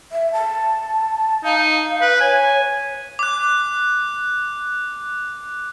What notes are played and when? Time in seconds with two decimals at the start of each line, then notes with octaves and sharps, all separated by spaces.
0.12 E5
0.33 A5
1.44 D#4 F5
2.01 B4
2.20 C#5 G#5
3.19 D6 F#6